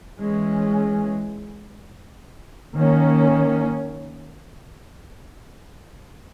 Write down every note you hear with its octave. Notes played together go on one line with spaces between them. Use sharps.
E3 G#3 C#4
D#3 A#3 C#4